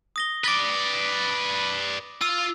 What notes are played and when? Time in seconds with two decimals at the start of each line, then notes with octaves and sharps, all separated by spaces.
0.16 D#6 A#6 G7
0.44 B4 D5 D6 A6 G7
2.21 F4 E6